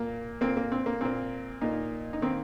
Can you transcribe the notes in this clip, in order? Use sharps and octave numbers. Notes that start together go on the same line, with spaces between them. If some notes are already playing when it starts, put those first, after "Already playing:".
Already playing: A#2 A#3
A#2 A#3 C4
A#3
C4
A#3
A#2 A#3 C4
A#2 A#3 D#4
D#4
D#3 A#3 C4